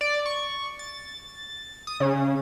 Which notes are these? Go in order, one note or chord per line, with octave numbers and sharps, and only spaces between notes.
D5
C#6
A6
D#6
C#3